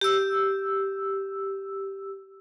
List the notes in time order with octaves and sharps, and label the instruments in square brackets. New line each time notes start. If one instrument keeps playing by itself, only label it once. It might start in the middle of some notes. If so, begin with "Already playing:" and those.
[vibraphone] G4 E6